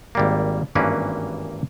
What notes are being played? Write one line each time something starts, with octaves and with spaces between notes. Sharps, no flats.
G#1 G3 A#3
G#1 G2 E3 A#3 C#4 B4